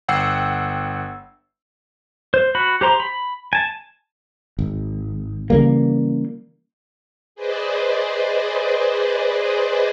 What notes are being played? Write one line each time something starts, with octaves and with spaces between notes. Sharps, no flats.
G1 F#5 G5 E6 C7
C5
F#4 B5
G4 C5 A#5 C6
B5
G#5 A5
G#1
C#3 E3 G3 A#3
G#4 B4 C5 D5 D#5